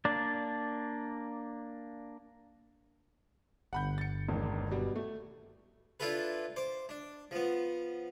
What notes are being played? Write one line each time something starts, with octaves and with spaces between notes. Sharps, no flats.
A#3 D4 D5
G1 F#5 B5 G6
A6 C#7
E1 A1 D#2
B2 G3
A3
D4 E4 F4 A4 B4
C5 D6
D4
F3 B3